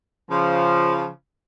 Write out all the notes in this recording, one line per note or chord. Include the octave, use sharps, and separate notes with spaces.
C#3 F3